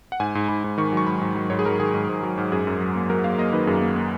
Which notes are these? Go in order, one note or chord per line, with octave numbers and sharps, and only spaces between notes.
F#5
G#2 G#5
G#2
G#2 B5
G#2
D#3 C#6
F#3 C#6
G#2 B5
G#2
F#3
G#2 C#5
G#4
F#3 A#4
D#3 G#4
G#2
G#2
F#3
G#2
F#2 G#4
F#2
F#3
A#3
F#3 A#4
A#3 F5
A#3 D#5
D#3 B4
F#2 G#4
A#3
A#3